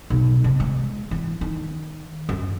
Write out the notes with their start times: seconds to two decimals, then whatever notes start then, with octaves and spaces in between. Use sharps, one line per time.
0.10 B1
0.44 C3
0.60 G#3
1.11 E3
1.41 D#3
2.29 F#2